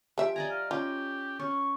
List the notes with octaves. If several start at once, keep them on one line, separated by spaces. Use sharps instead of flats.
F3 G4 E5
D5 D#5 G#5 A#5
F5
C#4 F4 G4
C#4 C#6